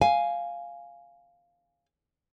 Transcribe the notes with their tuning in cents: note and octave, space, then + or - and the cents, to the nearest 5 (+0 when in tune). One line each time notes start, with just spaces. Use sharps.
F5 +0 G#5 +0